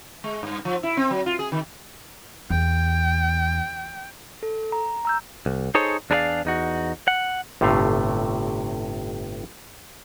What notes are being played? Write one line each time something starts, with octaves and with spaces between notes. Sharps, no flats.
G#3
G2
F3
E4
C4
F#3
F4
G#4
D#3
E2 G5
A4
A#5
A#5 E6 G6
C2
D#4 G#4 A4 C5 C#5
E2 D4 G#4 A#4 D5 F5
E2 D#4 F#4
F#5
G1 A2 C3 A3 F5